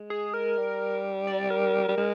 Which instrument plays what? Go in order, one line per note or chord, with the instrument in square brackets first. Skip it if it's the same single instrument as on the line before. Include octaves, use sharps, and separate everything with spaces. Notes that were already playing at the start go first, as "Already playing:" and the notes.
Already playing: [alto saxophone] G#3
[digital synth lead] G#4
A#4
[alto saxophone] G3
[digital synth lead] D5
A#4
[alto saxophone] G3
G#3